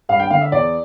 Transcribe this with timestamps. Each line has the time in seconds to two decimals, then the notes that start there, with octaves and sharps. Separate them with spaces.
0.09 G2 F5
0.20 G5
0.30 D3 F5
0.41 E5
0.52 E2 D5